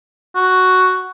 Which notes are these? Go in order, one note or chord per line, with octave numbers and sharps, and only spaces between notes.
F#4